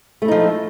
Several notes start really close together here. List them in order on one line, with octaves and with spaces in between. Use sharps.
A3 E4 D#4 F3